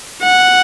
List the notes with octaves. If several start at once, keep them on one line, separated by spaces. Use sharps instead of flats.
F#5